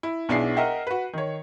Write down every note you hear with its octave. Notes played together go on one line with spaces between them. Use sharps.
E4
B1 B3 D4 E4 G#4 C7
A#4 D#5 E5 F#5 G5
F#4 B4
D#3 C#5